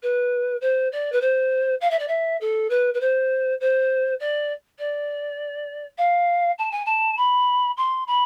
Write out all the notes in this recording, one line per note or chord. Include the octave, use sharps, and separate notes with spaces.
B4
C5
D5
B4
C5
F5
E5
D5
E5
A4
B4
B4
C5
C5
D5
D5
F5
A5
G#5
A5
B5
C6
B5